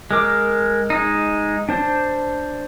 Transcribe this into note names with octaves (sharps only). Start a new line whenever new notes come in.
G#3 A#4 D6
G#3 D#4
D4 C5